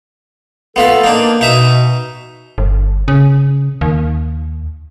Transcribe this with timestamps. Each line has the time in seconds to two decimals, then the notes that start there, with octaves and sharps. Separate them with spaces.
0.76 A3 B3 F4 A4 B4
1.04 A#3 D4 D#4
1.41 B2 D#4 E5 D#6
2.58 G1
3.08 C#3
3.81 D#2